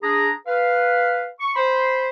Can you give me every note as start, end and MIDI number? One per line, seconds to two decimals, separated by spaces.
0.03 0.31 62
0.03 0.31 68
0.03 0.31 82
0.47 1.29 71
0.47 1.29 77
1.40 1.52 85
1.55 2.09 72
1.55 2.09 83
1.55 2.09 84